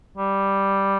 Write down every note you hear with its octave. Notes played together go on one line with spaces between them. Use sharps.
G3